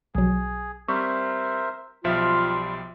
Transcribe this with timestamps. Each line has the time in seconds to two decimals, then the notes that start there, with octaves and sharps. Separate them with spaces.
0.15 B1 F#3 G#4
0.88 G3 C4 A#4 C5 E5 C#6
2.04 B1 F3 G3 F4 E5 C6